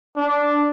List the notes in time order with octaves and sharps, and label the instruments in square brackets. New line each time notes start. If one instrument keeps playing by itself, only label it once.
[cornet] D4